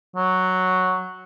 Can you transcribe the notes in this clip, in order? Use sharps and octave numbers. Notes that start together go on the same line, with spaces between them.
F#3